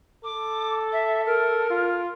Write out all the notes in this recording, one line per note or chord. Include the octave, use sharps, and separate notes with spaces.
A4 D6
E5
A#4
F4